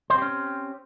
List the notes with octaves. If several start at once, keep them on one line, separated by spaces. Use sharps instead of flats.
C4 C#4 G4 C5